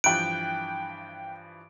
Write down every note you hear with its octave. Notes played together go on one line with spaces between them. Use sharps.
G2 E3 F3 G5 F#6 D7